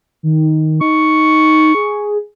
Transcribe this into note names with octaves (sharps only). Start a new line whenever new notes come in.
D#3
D#4 C#6
G#4